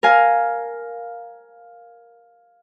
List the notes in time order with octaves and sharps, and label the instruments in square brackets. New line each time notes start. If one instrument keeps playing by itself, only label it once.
[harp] A#4 F5 G#5